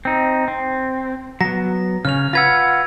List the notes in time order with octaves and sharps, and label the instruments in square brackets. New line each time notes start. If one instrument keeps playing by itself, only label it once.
[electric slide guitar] C4 D#4
C4
[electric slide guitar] F#3 B3 [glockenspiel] A#6
[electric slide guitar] C#3 C#4 [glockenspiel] F6 F7
[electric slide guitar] F4 B4 F#5 [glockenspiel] E6 G#6 A#6